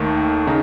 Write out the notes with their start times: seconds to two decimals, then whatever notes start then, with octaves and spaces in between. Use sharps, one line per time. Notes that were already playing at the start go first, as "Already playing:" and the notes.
Already playing: D#2 D#3 A3
0.47 C#3 D#4